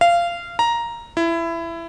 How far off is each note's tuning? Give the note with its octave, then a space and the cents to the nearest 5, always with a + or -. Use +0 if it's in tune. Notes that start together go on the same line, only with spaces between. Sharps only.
F5 -20
A#5 +5
E4 +20